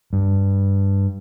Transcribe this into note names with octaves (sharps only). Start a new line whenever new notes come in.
G2